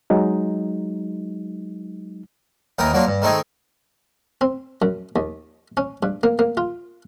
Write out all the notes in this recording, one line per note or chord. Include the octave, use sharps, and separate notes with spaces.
F#3 G#3 D#4
D#2 E3 A#4 G5 D#6
F#3 A#3 D4 F4
G2
D#3 A3 C4 D#4 G#4
C4
F#2
D#2
C#4
G2
A#3
A#3
F4